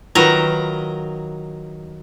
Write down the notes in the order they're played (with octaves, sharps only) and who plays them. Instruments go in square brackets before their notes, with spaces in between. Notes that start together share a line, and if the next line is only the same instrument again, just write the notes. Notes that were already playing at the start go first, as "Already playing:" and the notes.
[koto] D#3 F#3 A#5 [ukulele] F4 B4